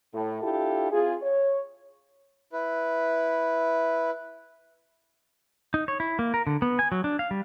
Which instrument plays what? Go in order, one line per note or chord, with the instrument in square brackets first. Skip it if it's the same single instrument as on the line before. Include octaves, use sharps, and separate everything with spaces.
[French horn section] A2
D4 E4 F4 G4 A4
C4 F4 G#4
C#5
[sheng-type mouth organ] E4 B4
[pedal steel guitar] D#4
C#5
E4
A#3
A#4
D3
B3
G#5
F#3
D4
F5
G3